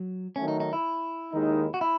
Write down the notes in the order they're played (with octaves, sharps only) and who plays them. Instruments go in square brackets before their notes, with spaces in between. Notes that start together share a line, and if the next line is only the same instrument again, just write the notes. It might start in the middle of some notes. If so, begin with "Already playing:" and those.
Already playing: [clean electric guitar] F#3
[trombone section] D#3 F#3 A3 [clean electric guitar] C#4
[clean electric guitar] D#4
D#4
E4
[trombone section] D#2 D#3 G#3 D#4
[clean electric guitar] F#4
E4